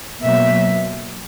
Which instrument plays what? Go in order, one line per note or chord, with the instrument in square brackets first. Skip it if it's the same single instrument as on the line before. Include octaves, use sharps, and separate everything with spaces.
[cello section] B2 F#3 A#3 E5